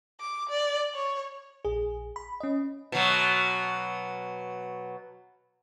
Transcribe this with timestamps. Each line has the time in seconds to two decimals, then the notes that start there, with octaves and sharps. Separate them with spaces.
0.20 D6
0.49 D5
0.94 C#5
1.65 A#1 G#4
2.16 B5
2.40 C#4 D#5
2.92 B2 F#3